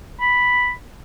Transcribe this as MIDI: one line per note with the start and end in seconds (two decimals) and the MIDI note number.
0.20 0.71 83